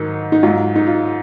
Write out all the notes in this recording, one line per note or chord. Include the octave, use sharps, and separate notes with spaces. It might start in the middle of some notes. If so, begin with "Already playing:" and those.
Already playing: G#2 D#3 F#3 D#4
D#4
G#2 F#3 F4
D#4
F4